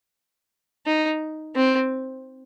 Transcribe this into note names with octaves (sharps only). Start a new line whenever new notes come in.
D#4
C4